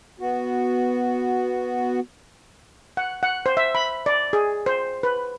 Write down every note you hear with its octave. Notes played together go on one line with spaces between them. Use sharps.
B3 F#4
F#5
F#5
C5
E5
B5
D5
G#4
C5
B4